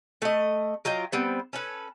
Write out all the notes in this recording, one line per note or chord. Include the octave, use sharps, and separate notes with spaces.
A3 D#5
F#3 F4 D#5 G5
G3 B3 C4
C#4 A4 B4